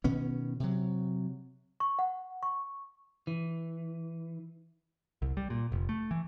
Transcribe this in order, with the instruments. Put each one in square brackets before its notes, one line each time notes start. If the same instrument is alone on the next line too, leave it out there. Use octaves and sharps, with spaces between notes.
[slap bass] B2 D#3 B3 C#4
C3 F#3
[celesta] C#6
F#5
C#6
[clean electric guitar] E3
[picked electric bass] C2
G3
A#2
F1
A3
E3